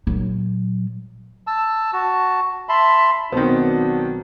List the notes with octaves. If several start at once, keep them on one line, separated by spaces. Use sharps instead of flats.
A#2 F#3
A5 E6
F#4 A5
E5 A5 B5 C6
B1 B2 D#3 B3 C4 D4 F#4